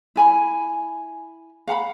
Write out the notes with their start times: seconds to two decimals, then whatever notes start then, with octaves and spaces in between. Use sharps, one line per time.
0.16 E4 G#5 B5
1.67 F5 F#5 A#5 B5